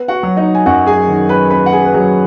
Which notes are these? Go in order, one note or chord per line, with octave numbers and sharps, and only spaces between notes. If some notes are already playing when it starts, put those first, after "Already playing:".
Already playing: B3
F#4 F#5
F#3
D#4 D#5
G#5
F#2 F#4 F#5
G#4 G#5
D#3
B4 B5
B3 B4 B5
F#5
G#4 G#5
B4
F#3 G#4